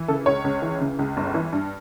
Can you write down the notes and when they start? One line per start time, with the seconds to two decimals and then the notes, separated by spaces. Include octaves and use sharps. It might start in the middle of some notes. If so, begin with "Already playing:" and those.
Already playing: E3
0.08 C#3 A4
0.26 C#2 C#5
0.44 C#2
0.62 E3
0.80 C#3
0.99 C#2
1.17 G1
1.34 E3
1.52 G2